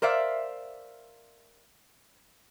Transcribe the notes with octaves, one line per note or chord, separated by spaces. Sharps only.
A#4 C5 D5 E5 F5